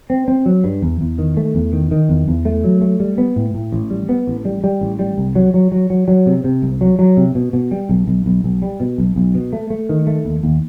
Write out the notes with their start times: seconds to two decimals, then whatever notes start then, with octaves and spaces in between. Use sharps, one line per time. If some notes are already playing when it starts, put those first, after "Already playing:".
0.10 C4
0.28 C4
0.46 F#3
0.64 G2
0.82 E2
1.01 E2
1.18 D#3
1.37 A3
1.55 E2
1.73 D#3
1.91 D#3
2.09 E2
2.28 E2
2.45 A3
2.64 F#3
2.81 A3
3.00 G3
3.18 B3
3.36 A2
3.54 A2
3.72 A1
3.91 G3
4.09 B3
4.27 A1
4.45 G3
4.64 G3
4.81 A1
4.99 G3
5.18 C2
5.35 F#3
5.54 F#3
5.72 F#3
5.90 F#3
6.08 F#3
6.26 C3
6.44 C3
6.62 C2
6.81 F#3
6.99 F#3
7.17 C3
7.35 B2
7.53 B2
7.71 G3
7.89 B1
8.07 B1
8.26 B1
8.44 B1
8.62 G3
8.80 B2
8.98 B1
9.16 B1
9.35 B2
9.53 A3
9.70 A3
9.89 D#3
10.07 A3
10.25 D#2
10.43 D#2